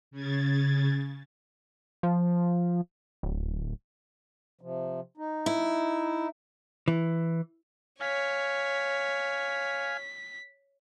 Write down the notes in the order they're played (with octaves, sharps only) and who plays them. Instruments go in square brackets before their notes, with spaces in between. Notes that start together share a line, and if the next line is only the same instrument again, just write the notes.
[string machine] C#3 G#6 A6
[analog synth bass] F3
D1
[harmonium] C3 F3
D#4
[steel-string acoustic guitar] E4
[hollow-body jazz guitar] E3
[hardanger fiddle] C#5 [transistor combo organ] F5 G#5 [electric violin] B6